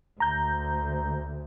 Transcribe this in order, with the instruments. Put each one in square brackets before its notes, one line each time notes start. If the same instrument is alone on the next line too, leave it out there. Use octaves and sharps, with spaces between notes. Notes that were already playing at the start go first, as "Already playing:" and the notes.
[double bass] D2 [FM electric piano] A#5 G6